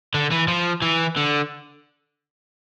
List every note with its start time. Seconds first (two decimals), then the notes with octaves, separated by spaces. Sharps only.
0.14 D3
0.31 E3
0.48 F3
0.82 E3
1.16 D3